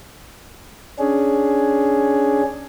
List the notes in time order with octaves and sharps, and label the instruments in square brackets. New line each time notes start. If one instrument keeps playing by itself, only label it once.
[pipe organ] C#4 D4 G#4